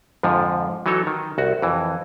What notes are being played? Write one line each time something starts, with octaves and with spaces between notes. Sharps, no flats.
F2 G#2 D3 F3
E3 F#3 D#4 A4 C#5
D#3
C2 F#4
F2 E3